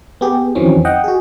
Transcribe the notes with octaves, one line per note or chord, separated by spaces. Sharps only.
B3 G4 G#4
F2 D#3 E3 F#3 C4 C#4
D#5 F#5 G5
F#4 G#4